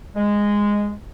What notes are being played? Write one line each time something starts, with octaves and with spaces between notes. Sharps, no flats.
G#3